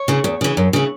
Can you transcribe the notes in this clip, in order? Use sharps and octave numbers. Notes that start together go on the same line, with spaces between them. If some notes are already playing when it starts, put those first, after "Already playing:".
Already playing: C#5
C#3 E3
E2
C#3 E3
F#2
C#3 E3